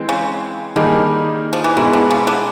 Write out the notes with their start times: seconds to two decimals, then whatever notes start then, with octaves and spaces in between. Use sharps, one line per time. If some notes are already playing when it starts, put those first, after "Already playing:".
Already playing: E3 G#3 C4
0.09 C#3
0.76 D3 D#3 G3 A#3 D#4 G#4
1.53 F3
1.64 E3
1.77 B2 D#3 G#3 B3 E4 G#4
1.93 D3
2.11 C#3
2.27 D3